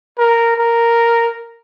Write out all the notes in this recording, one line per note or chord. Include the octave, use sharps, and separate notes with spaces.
A#4
A#4